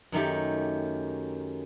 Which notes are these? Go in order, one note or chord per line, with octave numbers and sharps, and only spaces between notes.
F#2 D#3 A3 G4